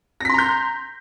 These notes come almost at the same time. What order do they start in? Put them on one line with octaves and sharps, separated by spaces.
A#6 B6 C6 A#5 G6